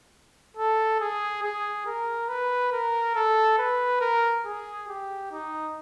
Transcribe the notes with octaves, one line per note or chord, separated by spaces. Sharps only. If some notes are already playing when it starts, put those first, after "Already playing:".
A4
G#4
G#4
A#4
B4
A#4
A4
B4
A#4
G#4
G4
D#4